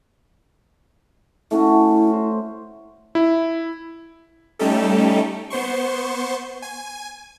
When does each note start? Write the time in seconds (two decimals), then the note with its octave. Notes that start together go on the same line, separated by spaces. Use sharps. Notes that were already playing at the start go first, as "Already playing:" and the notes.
1.51 A3 C#4 E4 F#4
2.13 C5
3.15 E4
4.59 G3 A3 C#4 D#4 G4 A4
5.50 B3 C5 C6 C#6
6.62 G#5